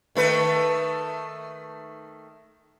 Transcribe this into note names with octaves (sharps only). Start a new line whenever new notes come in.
D#3 A3 B4